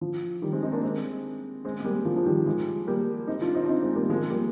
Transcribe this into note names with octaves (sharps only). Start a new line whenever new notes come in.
F3
D#3 G3
G#3 C4
C4 D#4
A#3 D4
G#3 C4
G#3 C4
G#3
G3 A#3
F3
F3
D#3 G3
F3 G#3
G3 A#3
C4 D#4
D4 F4
C4 D#4
D4
C4 D#4
G#3 C4
G3 A#3
F3 G#3
G3 A#3